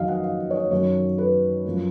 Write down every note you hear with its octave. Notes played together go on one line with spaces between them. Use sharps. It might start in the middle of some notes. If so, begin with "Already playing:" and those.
Already playing: F2 D#3 F#3 D#5 F5
F#5
F5
C#5
D#5
F#2 D#3 F#3 C#5
B4
F#2 F3